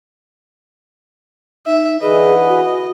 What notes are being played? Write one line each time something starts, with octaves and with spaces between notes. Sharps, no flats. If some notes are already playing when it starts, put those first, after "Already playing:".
D#4 E5
D3 E3 G#4 B4 D#5
F#4